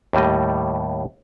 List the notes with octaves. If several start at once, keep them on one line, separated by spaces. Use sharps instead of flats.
D#2 A2 G3 D#5